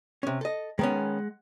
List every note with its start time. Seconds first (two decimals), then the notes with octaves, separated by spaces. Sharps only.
0.23 C3 C#4
0.41 A4 D#5
0.79 D#3 G#3 B3 C#4 F#5